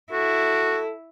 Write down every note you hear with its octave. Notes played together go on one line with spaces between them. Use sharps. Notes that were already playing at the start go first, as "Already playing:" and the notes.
E4 F#4 A4